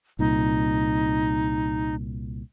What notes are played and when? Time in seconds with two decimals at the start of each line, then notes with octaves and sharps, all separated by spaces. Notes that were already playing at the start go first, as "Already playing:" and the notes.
0.19 C2 A#2 D#4